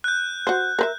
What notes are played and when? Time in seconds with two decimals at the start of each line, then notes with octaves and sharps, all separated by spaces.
0.04 F#6 G6
0.47 F#4 C5
0.79 A#4 B4 E5